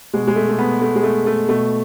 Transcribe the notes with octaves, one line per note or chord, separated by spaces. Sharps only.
B2 G#3
G#3
A3
A3
B3
A3
G#3
A3
A3
B2 A3